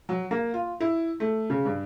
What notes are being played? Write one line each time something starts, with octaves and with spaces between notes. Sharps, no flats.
F#3
A#3
F4
E4
A3
C#3
G2